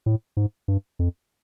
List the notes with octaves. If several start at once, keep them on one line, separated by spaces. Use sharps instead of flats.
A2
G#2
G2
F2